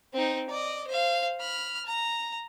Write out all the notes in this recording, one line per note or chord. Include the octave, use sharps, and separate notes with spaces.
C4 D#4
D5 D#5
C5 F5
B5 F6
A#5